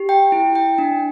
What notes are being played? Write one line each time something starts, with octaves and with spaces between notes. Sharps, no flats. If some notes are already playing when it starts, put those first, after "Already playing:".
Already playing: G4
G5
E4
G5
D4